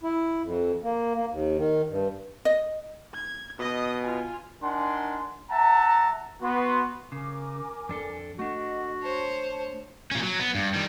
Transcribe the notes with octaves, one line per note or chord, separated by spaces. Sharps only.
E4
F2
A#3
A#3
D#2
D#3
G2
D#5
G#6
B2 D#5 D#6
F4 G#5
D4 D#4 A#4 F#5 G#5 C6
E5 F#5 A5 A#5
B3 F#4 C6
C#3 A#4 G#5 D6
F2 D4 A4
A3 D4 F#4 A4 D#5 F#5
C5 C#5 A5
A#2 C#4
F#3
B3
G2
D#3 G3